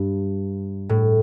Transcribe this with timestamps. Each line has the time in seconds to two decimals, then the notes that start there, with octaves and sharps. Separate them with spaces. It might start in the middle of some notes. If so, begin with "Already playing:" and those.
Already playing: G2
0.89 A2